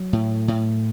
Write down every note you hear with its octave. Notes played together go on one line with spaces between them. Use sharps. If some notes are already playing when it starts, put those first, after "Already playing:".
Already playing: F#3
A2
A2